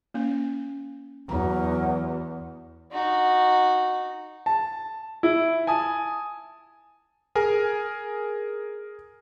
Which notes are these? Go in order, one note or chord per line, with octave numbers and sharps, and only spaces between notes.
A#3 C#4
E2 F#3 A#5
D#4 F#4
A5
E4
G#5 A5 D#6
G#4 A#4 G#5